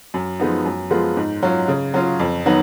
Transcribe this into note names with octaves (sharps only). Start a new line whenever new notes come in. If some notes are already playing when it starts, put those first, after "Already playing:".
F#2
F3 G#3 B3 D#4
F#2
F3 G#3 B3 F4
G#2
F#3 C#4 F4
C#3
F#3 C#4 F4
F2
D#3 F#3 B3 D#4